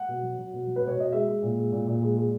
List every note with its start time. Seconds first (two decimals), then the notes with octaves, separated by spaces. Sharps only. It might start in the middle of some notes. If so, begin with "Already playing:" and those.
Already playing: F#5
0.08 B2
0.23 F#3
0.38 F#3
0.53 B2
0.67 F#3
0.76 B4
0.82 B2
0.88 C#5
0.97 B2 D#5
1.12 G#3 E5
1.28 G#3
1.43 A#2
1.58 G#3
1.72 A#2
1.87 A#2
2.03 G#3
2.17 G#3